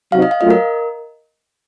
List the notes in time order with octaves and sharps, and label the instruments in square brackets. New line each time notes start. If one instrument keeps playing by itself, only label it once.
[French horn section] C3 F#3 C4 D#4 F#4 [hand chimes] F5
[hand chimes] D#5
F5
[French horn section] F#3 A3 C#4 F4 [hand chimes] D#5
[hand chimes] A#4